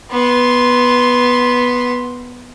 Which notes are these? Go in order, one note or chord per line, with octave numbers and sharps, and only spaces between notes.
B3 C6